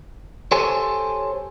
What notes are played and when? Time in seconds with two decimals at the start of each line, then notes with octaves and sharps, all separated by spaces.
0.52 G4 A4 C5 C#5 G#5